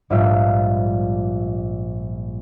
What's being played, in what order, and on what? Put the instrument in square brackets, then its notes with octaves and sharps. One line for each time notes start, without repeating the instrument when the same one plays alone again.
[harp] A#1 G#2 G3 F4 D5 E5